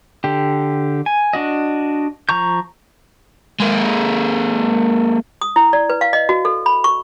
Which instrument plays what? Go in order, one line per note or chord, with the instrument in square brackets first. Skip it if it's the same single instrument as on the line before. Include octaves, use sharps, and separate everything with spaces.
[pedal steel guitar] D3 G4
G#5
D4 F#4 D#5
F3 A#5 C#6 G6
[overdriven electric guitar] G#3 A#3
[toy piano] D#6
E4
D5
B4
F5
D#5
F#4
A4
B5
C#6